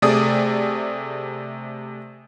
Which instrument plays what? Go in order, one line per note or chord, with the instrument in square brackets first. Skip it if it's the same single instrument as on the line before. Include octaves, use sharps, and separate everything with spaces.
[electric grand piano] C3 A3 G#4 D5 D#6